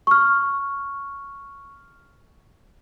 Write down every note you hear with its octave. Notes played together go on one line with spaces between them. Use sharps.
C#6 F6